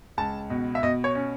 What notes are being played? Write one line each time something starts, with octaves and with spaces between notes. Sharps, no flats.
C#2 A5
B2
E5
B2 D#5
C#5
C#4